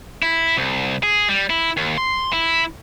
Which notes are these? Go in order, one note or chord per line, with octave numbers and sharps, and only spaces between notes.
E4
C2
G#4
G3
E4
D#2
C6
E4